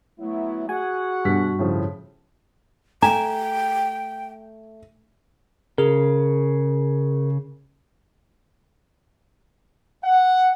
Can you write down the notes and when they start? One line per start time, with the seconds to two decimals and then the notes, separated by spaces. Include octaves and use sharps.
0.19 F#3 A3 B3 E4
0.69 F#4 G#4 F#5 G#5
1.25 G2 B2 B6
1.59 A2 C#3 F3
3.02 A3 G5 G#5 A#5
5.78 C#3 G#4 A#4
10.04 F#5